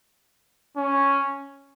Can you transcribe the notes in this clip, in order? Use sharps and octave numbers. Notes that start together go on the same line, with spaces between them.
C#4